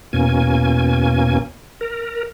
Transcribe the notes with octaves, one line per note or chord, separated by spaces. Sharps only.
E2 B2 A#3 C#4 G#5
A#4